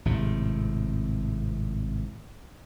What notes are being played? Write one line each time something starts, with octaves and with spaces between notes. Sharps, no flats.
G#1 A2 C3